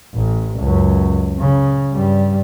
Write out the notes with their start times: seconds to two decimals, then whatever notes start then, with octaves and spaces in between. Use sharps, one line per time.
0.14 A1
0.60 C#2 F#2
1.39 C#3
1.93 G2 G3